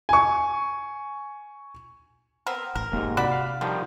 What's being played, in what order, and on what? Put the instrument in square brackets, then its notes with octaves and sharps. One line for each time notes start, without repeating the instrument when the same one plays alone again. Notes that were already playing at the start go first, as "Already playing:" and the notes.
[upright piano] G#5 C#6
[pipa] B3 C4 A#4
[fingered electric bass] A1 [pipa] A#4
[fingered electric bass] F1 A#3 [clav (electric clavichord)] D#2 G#2
[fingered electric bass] C3 [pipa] F#4 D5 B5
[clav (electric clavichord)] F5
[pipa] D3 [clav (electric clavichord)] D#3 F3 G3